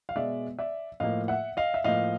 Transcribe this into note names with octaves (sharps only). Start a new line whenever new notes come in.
F5
B2 G#3 D5 E5
D5 E5
A2 F3 A#3 D#5 F5
E5 F#5
D#5 F5
E5
A2 F3 A#3 D#5 F5